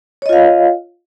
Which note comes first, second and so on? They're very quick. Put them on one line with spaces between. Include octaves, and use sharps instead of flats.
C#5 D#5 F4 F5